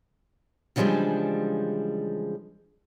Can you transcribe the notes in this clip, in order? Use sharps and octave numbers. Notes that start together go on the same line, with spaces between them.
C#3 E3 F3 G3 G#3 D4